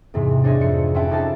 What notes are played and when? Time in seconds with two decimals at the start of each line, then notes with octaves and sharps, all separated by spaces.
0.14 E2 G#2 C3
0.44 D4 C5 C#5 D#5 E5
0.61 F2 C5 C#7
0.94 C#4 F4 B4 E5 G5 A5
1.10 C#4 D#4 G4 A4 C5 A5